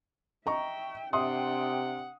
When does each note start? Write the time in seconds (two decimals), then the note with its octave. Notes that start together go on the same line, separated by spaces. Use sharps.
0.46 D#5 E5 G5 A#5 C#6
1.13 C3 D4 E5 F#5 G5 C6 D#6